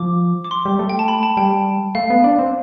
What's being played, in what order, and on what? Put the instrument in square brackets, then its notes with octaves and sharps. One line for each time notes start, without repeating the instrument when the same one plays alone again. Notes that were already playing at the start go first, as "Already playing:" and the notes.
Already playing: [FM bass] F3 [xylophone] D6
[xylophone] D6
C6
[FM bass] G3
A3
[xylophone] G5
A5
B5
A5
[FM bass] G3 [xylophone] G5
[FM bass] A3 [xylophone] F5
[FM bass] B3
D4
C4